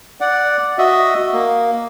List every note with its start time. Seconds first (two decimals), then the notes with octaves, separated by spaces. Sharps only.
0.21 D5 F#5
0.78 F#4 D#5 E5
1.33 A#3